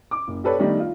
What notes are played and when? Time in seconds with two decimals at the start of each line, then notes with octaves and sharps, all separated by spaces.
0.11 D6
0.28 F#1
0.44 G4 A4 B4 C#5 D5
0.59 D#3 G3 A3 B3 D4 D#4
0.80 F4